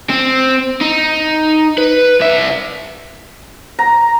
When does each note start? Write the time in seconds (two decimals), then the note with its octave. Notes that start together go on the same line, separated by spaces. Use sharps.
0.10 C4
0.81 D#4
1.78 B4
2.21 C2 E5
3.79 A#5